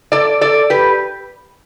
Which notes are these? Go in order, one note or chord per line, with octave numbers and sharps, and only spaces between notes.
A4 D5
A4 D5
G4 B4